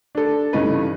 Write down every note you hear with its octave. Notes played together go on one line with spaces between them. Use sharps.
D4 A4
G2 C#3 E3 A3 D#4 B4